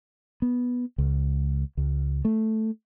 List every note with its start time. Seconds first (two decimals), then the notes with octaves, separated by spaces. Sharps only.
0.42 B3
0.98 C#2
1.77 C#2
2.25 A3